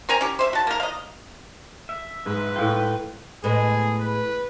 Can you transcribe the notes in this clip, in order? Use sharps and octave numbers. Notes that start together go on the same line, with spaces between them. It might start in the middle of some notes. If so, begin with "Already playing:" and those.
C4 A#4 G#5 A#5
C#4 G4
C5 E5
F#4 A5
A#3 A#4
D#5 F5
E5
G#2 B4
A2 F4 G5
A2 G#3 B3 G#4
B4